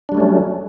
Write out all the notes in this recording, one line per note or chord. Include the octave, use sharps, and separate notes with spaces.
F#3 G3 A3 C#4 D4